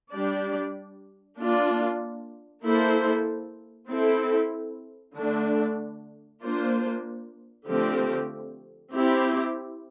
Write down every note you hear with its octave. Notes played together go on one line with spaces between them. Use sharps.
G3 D4 G4 D5
A#3 D4 F4
A#3 E4 A4 C5
C4 E4 A4
D3 A3 D4
A#3 D4 F4 C5
D3 F3 A3 C4 G4
C4 E4 G4